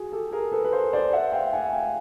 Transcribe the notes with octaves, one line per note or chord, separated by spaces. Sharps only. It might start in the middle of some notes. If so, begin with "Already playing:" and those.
Already playing: F#4 G#4
G4 A4
G#4 A#4
A4 B4
B4
A#4 C5
C5 D5
E5 F#5
F5 G5
F#5 G#5
G#5
F5 G5